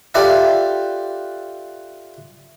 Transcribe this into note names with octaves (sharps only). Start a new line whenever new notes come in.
F4 G4 A4 B4 D5 E5